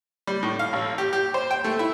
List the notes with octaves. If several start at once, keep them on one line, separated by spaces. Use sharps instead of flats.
G3
A2
F5
A1
G4
G4
C5
G5
A3
E4